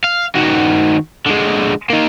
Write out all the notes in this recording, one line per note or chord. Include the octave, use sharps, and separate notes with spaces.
F5
D#3 F#4
D3 G#3
A#3 D#4